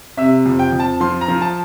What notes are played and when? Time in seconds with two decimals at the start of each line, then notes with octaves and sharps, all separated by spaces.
0.17 C3 E5
0.46 F2
0.59 G5
0.72 F2
0.80 A5
1.00 F3 C6
1.21 A#5
1.28 F3
1.42 A5